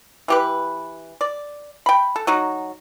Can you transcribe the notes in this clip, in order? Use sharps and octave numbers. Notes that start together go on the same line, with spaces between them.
E3 G4 B4
D5
G5 B5
A4
F#3 D#4 F#4